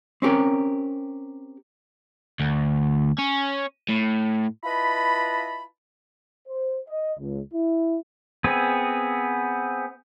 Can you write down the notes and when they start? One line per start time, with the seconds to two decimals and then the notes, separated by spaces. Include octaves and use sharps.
0.22 C4 C#4 G4 A#4
2.39 D2
3.19 C#4
3.89 A2
4.63 E4 F4 B4 D#5 A5 B5
6.48 C5
6.89 D#5
7.19 C#2
7.54 E4
8.44 B3 C4 G#4